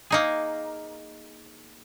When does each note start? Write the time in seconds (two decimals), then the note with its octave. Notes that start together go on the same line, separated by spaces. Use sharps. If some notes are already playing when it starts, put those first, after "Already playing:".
0.10 A#3 D#4 G#4